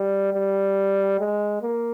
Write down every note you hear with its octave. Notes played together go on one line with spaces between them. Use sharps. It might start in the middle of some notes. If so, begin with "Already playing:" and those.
Already playing: G3
G3
G#3
A#3